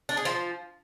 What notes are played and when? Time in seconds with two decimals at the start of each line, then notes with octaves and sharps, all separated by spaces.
0.09 D4
0.17 G#4
0.25 F3